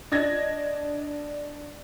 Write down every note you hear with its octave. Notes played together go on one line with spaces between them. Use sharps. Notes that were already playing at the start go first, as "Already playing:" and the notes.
D4 D#5 G#6 A#6